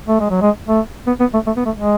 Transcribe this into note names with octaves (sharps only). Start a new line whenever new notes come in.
A3
G#3
F#3
G#3
A3
B3
B3
A3
A3
B3
A3
G#3